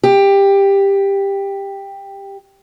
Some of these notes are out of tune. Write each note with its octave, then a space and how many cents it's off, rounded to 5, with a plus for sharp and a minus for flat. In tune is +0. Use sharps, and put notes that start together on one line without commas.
G4 +10